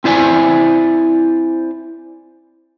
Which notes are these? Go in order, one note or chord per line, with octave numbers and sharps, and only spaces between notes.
C4 E4 C5 D5 G#5